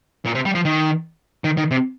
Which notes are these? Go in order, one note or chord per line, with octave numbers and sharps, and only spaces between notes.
A#2
C3
G3
F3
D#3
D#3
D#3
C3